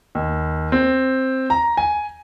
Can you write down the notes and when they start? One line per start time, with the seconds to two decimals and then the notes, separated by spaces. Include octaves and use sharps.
0.15 D#2
0.72 C4
1.50 A#5
1.77 G#5